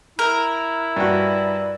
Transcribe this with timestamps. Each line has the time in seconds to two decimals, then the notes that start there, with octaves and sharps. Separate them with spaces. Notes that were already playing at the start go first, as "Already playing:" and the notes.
0.19 E4 A#4
0.97 G2 F#4 D5